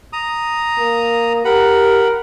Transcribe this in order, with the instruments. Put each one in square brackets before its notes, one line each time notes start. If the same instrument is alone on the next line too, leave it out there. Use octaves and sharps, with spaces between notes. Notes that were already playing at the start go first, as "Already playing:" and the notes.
[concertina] A#5 D#6
[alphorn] A#3
[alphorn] G4 [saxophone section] A#4 [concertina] F#5 B5